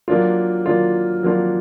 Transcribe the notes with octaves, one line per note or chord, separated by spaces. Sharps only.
F#3 A#3 D4 F4
F#3 A#3 D4 F4
F#3 A#3 D4 F4